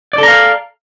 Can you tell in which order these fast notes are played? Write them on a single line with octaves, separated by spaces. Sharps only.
D5 A4 A#5 F5